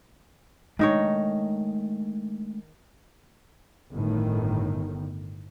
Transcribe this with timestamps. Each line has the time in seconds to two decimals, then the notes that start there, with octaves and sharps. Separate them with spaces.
0.79 D#3 G#3 A3 D4 D#4 C#5
3.92 G1 A2 D#3